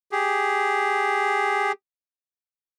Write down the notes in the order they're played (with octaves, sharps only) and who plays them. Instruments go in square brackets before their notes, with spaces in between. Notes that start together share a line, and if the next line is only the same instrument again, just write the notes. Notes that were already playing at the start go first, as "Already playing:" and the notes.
[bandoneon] G4 G#4